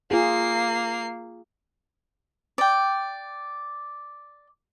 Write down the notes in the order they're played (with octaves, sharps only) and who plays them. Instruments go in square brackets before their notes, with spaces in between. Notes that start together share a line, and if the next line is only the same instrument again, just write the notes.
[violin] A#3 C7 [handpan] F4 G#4
[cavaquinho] D5 G5